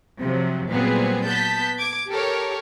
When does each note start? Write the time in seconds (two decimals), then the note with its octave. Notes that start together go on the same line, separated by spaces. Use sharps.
0.22 C3 F3 F#3
0.70 A#2 F#3 G3 B3 C4 G#4
1.27 B3 A5 G6 B6
1.78 D6 G#6
2.08 G4 A4 A#4 C#5